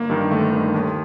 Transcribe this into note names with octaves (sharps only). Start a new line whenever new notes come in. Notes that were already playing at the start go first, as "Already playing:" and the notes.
Already playing: G1 A#3
G2 D#3
G1 A3
G2 D#3
D#2